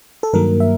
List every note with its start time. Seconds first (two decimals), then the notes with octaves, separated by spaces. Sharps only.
0.23 A4
0.33 G2 D#3 F#3 A#3 A#4
0.60 E5